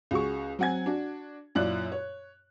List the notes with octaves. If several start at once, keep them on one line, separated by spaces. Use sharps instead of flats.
C#2 F#4 G#4 C#6
F#3 C4 F#5 G#5 G#6
D4 F#4
F#2 A#2 E4 D5 F#6 F#7
C#5